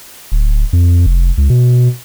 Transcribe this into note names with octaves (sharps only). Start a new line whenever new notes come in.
D1
F2
F1
C#2
B2